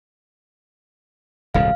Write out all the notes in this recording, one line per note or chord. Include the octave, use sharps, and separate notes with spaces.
D#1 C2 G#2 F5